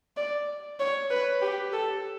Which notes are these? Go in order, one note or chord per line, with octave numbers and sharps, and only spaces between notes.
D5
C#5
B4
G4
A4